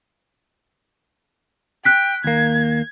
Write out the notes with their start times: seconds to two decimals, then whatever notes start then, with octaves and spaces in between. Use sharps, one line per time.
1.85 G5 F#6 B6
2.24 D#2 A#3 G#6